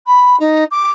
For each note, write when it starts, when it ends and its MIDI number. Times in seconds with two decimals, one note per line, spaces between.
0.06 0.38 83
0.39 0.64 63
0.71 0.91 86